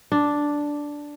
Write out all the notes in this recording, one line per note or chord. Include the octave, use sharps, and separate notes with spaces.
D4